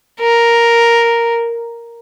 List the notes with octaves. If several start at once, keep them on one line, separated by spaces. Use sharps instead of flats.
A#4